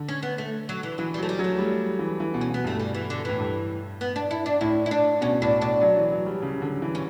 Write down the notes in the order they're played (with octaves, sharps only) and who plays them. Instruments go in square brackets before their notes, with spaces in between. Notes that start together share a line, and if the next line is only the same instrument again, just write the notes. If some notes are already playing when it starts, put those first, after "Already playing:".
Already playing: [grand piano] D3
[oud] C#4
B3
A3
F#3
E3
[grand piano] E3 [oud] F#3
[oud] G3
[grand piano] F#3 [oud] A3
[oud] G3
[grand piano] F#3
[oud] A3
[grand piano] G3
E3
E3
B2
[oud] C#4
[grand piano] B2 [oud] B3
[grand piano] G2 [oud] A3
[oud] G3
E3
D3
[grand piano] A2 [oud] E3
[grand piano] G2
[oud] B3
D4
E4
D4
[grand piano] A2 [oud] E4
[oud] E4
D4
[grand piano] B2 [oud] C#4
[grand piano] A2 [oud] D4
[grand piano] A2 [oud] D4
[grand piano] F#3
E3
F#3
G3
C#3
D3
E3
[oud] C#4